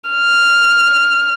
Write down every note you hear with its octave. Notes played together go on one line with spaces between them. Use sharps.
F6